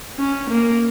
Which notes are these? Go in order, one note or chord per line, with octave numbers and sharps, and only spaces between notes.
C#4
A#3